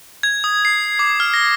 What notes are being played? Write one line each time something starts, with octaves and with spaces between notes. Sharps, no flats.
G#6
D#6
C7
D6
F6
A#6